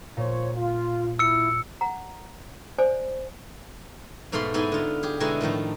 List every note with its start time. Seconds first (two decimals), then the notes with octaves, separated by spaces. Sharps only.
0.17 A#2 F3 C5 C#5
0.56 F4
1.19 E4 E6 C#7
1.81 F#5 A#5
2.78 C5 D5 G#5
4.32 G#2 B2 A3 F5 B5 C6
4.54 G#2 B3 D#4 E4 G#5 C6
4.72 D3 F4
5.03 G4 G#4
5.20 B2 D3 G#3 D#4 E4 G#5
5.41 A2 D#3 F3 D#4